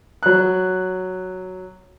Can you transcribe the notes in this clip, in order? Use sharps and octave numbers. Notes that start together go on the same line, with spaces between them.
F#3 F#6